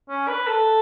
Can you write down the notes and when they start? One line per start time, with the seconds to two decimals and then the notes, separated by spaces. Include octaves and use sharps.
0.09 C#4
0.28 B4
0.47 A4